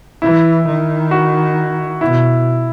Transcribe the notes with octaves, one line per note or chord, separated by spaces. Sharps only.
E3 E4
D#3
F#4
B2 E4